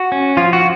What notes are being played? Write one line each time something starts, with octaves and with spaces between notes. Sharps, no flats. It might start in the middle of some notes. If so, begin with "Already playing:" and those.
Already playing: F#4
C#4
F3 F4
F#4